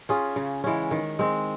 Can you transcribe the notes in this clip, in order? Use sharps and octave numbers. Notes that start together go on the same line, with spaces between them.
C#4 F4 G#4
C#3
E3 G#3 C#4
D#3
G#3 C4